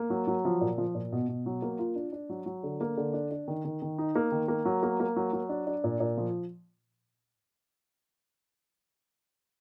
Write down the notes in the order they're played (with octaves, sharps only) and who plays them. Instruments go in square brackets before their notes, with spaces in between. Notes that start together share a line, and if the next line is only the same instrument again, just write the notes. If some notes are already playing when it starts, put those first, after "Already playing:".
Already playing: [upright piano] A#3
F#3
F#3
F3
A#2
F3
A#2
B2
B2
F#3
A#3
F4
D4
D4
F#3
F#3
D3
A#3
D3
D4
D4
D#3
D#3
D#3
D#4
A#3
D#3
A#3
F#3
A#3
A#3
F#3
F#3
D4
D4
A#2
A#2
F3